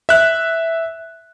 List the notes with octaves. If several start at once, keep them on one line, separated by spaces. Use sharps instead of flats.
E5 F#6